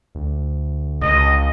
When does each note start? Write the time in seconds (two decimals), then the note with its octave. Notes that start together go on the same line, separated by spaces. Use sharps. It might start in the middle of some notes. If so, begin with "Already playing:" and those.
0.15 D2
1.02 C#2 D#5